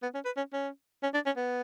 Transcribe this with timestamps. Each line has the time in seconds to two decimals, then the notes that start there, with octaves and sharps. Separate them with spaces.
0.03 B3
0.14 C#4
0.25 B4
0.37 C#4
0.53 C#4
1.03 C#4
1.14 D4
1.26 C#4
1.37 B3